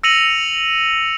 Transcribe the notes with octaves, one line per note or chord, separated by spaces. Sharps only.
E6 A#6 C#7 D#7 F7 F#7